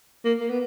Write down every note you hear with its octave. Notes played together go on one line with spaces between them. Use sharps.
A#3
A#3
B3